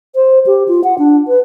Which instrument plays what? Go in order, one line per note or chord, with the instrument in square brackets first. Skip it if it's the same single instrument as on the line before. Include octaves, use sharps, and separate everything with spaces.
[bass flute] C5
G4
F4
F#5
D4
B4